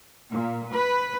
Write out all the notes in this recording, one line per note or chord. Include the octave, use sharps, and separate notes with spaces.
A#2
B4